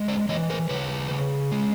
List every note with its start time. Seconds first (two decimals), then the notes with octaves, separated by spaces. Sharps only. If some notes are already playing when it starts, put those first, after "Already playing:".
Already playing: G#3
0.08 C5 D5
0.29 E3 C#5 D#5
0.50 A#4 C5
0.69 C#3 B4 C#5
1.11 C#3
1.52 G#3